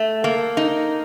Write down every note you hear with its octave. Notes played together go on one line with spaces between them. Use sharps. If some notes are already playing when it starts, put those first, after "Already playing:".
Already playing: A3
A#3
D#4